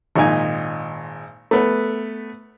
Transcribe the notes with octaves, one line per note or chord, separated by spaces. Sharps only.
G#1 A#2 D#4 G#5
A3 B3 B4